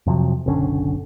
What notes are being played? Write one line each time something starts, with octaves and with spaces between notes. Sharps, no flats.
F2 C3 F3 F#3
F#1 B1 D3 C#4